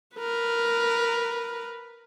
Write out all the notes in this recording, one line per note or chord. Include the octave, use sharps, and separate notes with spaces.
A#4 B4